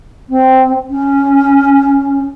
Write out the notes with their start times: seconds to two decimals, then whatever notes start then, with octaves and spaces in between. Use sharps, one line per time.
0.30 C4
0.90 C#4